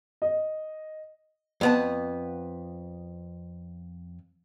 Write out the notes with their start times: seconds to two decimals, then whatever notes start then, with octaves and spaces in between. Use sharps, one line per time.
0.22 D#5
1.61 F2 B3 A5